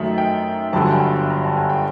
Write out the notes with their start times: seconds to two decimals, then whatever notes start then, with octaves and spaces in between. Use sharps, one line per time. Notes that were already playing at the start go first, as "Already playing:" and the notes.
Already playing: F#2 D#3 F#3 A3 E5
0.18 G5
0.73 G1 G2 D3 F#3 A5
0.82 G#5
0.91 G5
1.00 G#5
1.30 A#5
1.44 A5
1.57 G#5
1.70 G5